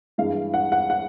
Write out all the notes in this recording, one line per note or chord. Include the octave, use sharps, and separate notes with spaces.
G2 E3 G#3 F5
F#5
F#5
F#5